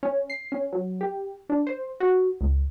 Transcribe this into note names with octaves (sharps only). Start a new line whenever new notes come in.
C#4
C7
C#4
F#3
G4
D4
C5
F#4
C#2